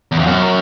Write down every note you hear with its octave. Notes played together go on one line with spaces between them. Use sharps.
E2
F2
F#2